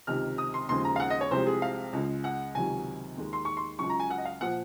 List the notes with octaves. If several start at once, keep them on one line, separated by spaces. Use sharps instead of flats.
C#2 C3 D#3 F6
D#6
C6
D#2 C#3 F3 G#3 C6
A#5
F5
F#5
D#5
C#5
C2 C3 F3 G#3 C5
G#4
F5
C#2 C#3 G#3
F#5
C#2 C3 D#3 F#3 G#5
D#2 D#3 G#3
C6
C#6
C6
C#2 C#3 F#3 C#6
A#5
G#5
F#5
D#5
F5
A#2 F3 F#5